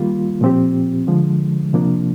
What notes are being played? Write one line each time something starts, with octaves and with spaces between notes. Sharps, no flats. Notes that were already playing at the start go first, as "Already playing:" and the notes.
Already playing: D#3 G3 A#3 F4
A#2 F3 C4 G4
D3 F3 G#3
C3 F3 A#3 D4